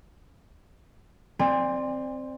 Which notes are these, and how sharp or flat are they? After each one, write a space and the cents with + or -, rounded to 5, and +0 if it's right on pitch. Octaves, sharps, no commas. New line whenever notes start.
C4 +0 D5 +20 G#5 -45